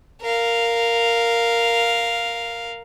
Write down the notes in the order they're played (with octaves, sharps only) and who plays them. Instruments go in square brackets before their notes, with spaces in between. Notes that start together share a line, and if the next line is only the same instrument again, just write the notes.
[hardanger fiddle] A#4 F5